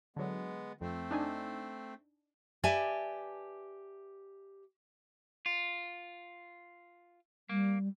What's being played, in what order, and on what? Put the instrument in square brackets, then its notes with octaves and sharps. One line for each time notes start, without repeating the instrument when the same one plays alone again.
[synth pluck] D3 F#3 [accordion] G#3 B3
[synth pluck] F2 [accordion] A3 C4
[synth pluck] D4 D#4 G#5
[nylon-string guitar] G4 B4 D5 E5 G#5 A5
[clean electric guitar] F4
[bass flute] G3 [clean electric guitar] A#3